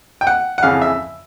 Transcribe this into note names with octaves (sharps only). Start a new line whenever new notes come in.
G5
F#5
F#5
F2 C#3 E3 F5
E5